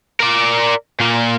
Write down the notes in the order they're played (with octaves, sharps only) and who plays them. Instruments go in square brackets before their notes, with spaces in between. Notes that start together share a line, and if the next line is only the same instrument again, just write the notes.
[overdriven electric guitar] A#4 D5
A#2 A#3